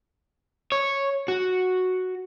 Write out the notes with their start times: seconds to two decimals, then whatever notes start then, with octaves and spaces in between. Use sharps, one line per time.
0.72 C#5
1.28 F#4